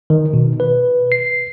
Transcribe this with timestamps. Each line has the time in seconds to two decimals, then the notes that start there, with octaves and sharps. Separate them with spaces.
0.10 D#3
0.34 B2
0.60 B4
1.12 C7